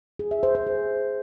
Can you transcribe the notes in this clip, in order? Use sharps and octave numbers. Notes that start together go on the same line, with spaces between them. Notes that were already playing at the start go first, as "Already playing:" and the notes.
G#4
E5
C5
C5
G#4